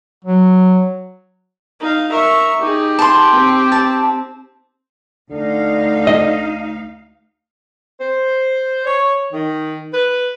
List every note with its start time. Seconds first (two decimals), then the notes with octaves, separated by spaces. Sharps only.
0.25 F#3
1.80 D#4 F5
2.12 A#4 E5 C#6
2.61 D#4 G4 G#4
2.99 A5 C6
3.32 C4
3.72 A5
5.31 D2 D3 D#4 F5
6.07 D#5
7.98 C5
8.84 C#5
9.32 D#3
9.91 B4